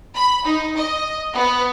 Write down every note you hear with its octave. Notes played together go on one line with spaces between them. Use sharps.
B5
D#4
D#5
B3